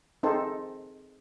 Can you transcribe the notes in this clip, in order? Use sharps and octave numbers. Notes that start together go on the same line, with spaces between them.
C4 D#4 G#4 A4 C5